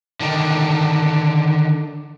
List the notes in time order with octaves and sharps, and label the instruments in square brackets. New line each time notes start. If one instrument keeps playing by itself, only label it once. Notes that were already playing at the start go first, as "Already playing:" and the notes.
[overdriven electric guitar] D3 D#3